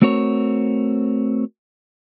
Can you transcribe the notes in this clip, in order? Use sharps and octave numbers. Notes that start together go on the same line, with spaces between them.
A3 C4 F#4 A#4 C#5